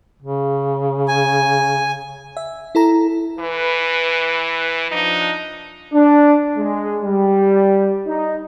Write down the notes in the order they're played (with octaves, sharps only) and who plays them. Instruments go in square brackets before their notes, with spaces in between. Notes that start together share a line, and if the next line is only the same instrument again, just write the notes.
[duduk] C#3
[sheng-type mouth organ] G#5
[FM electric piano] E5
E4 A4 A#5
[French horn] E3 [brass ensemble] B4
[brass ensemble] F3 D4 [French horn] D#4
[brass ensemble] D4
G#3
G3
D#4